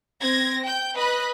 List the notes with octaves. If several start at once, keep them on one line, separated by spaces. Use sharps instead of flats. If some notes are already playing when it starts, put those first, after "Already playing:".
C4 G#6 A#6
G5 G6
B4 D#5 B5 F#6